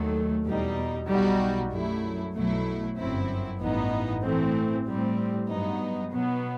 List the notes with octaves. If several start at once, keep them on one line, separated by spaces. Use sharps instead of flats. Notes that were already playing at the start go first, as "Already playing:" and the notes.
Already playing: D#2 D#3 F#3 A3
E2 B2 G3 D#4
B1 B2 G3 D#4 F#4
F#2 F#3 A3 E4
B1 B2 F#3 A3 E4
G1 F#2 F#3 C4 E4
A1 G2 E3 B3 D#4
A2 E3 A3 C4
A2 G3 C4
G2 F#3 B3 D#4
B2 F#3 B3